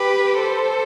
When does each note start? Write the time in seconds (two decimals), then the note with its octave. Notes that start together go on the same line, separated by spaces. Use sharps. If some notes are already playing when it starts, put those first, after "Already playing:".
Already playing: G4 B4
0.40 A4 C5